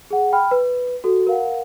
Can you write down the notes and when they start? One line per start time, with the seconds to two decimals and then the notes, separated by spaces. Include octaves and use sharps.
0.11 G#4 F#5
0.33 G5 B5 F6
0.51 B4
1.04 F#4 A4
1.27 A#4 F5 F#5